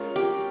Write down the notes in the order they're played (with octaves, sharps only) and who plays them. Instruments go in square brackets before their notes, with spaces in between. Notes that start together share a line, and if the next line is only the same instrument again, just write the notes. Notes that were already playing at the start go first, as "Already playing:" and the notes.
Already playing: [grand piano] G#3 C#4 F4 A#4
[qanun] G4